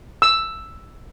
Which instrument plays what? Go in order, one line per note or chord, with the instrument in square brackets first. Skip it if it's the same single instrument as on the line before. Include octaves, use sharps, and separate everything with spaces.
[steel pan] E6